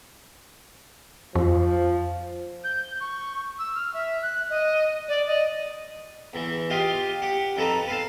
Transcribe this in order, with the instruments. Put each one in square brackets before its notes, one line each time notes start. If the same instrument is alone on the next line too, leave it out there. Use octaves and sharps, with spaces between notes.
[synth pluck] F2 [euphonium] F3
[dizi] G6
C#6
E6
F6
E5
F#6
D#5
D5
D#5
[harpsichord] E2 E3
F4 G4 D#5 F5
G4 F#5
F2 D#4 A4 B4 A#5
B4 F5 A5